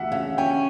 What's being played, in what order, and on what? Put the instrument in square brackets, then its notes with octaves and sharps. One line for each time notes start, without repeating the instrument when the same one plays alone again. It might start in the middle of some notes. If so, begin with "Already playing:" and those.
Already playing: [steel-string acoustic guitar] D2 [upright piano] E5 F#5
[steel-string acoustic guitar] C#3
[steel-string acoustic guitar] C#4 [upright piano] G5